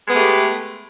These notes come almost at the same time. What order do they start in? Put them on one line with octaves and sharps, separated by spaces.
G#3 B3 A3 G4